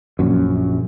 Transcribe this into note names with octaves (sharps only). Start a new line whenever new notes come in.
A#1 F#2